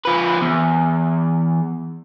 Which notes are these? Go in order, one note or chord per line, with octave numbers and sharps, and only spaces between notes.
F3 B4
E2